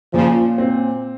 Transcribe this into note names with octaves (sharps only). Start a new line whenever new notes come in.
A#2 C#3 F3
C4